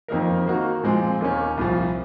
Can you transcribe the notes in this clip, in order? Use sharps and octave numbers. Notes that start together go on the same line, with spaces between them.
F2 D#3 A#3 D#4 A#4
D#3 A#3 D#4 F#4
A#2 F3 G#3 C4
D#2 D#3 A#3 C#4
C2 A#2 F3